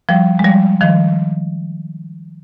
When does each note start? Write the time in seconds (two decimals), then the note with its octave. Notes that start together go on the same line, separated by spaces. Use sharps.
0.09 F3 G3
0.39 G#3
0.45 F3 G3
0.81 D#3 F3